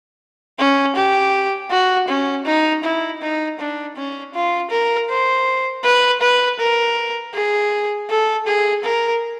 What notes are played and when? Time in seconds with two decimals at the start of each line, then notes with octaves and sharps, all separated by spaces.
0.59 C#4
0.96 G4
1.71 F#4
2.08 C#4
2.46 D#4
2.84 E4
3.22 D#4
3.59 D4
3.96 C#4
4.34 F4
4.71 A#4
5.10 C5
5.84 B4
6.22 B4
6.60 A#4
7.34 G#4
8.10 A4
8.47 G#4
8.84 A#4